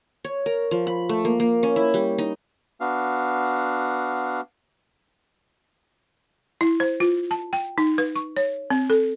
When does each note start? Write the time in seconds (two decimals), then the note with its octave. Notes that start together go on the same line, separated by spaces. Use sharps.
0.24 C#5
0.46 A#4
0.71 F3
0.87 B5
1.09 A3
1.25 A#3
1.40 A#3
1.63 C#4
1.76 E4
1.94 G3
2.18 D#4
2.80 B3 D4 F#4 F5
6.61 E4
6.80 C5
7.00 F4
7.31 A5
7.53 G5
7.78 D#4
7.98 B4
8.15 C#6
8.36 C#5
8.70 C4
8.90 A4